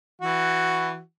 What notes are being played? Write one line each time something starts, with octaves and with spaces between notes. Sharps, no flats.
E3 F#4